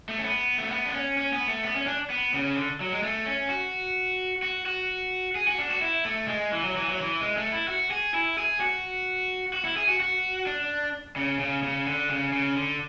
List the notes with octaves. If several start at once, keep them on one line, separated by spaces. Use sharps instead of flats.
A3
C#4
B3
A3
B3
D4
C#4
C#4
B3
A3
B3
C#4
D4
B3
C#3
D3
F#3
G#3
A3
C#4
F#4
F#4
F#4
G#4
F#4
D4
F#4
E4
A3
G#3
E3
F#3
E3
F#3
E3
G#3
A3
E4
F#4
G#4
E4
G#4
F#4
F#4
E4
G#4
F#4
F#4
D4
C#3
C#3
C#3
D3
C#3
C#3
D3